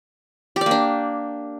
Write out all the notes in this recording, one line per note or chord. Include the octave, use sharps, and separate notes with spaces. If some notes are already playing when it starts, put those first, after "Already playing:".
G4
D5
A#3
D4